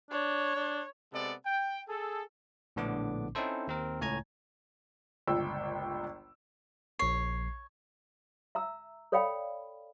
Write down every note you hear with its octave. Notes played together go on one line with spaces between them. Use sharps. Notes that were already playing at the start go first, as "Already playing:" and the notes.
D4 C#5
D4
C3 G#3 B3 A4 D5
G5
G#4 A4
A#1 A2 D3 B3 D4 D6
C4 C#4 D#4 E4 A4 C5
D#2 C4 A#4
C#2 A2 C#5 G#5 A#5 G#6
G1 C#2 A#2 G5 E6
A#1 C#5 C7
E5 A#5 E6
A4 C#5 D5 F5 G5 B5